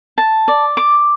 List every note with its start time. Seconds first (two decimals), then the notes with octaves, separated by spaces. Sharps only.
0.18 A5
0.48 D5
0.77 D6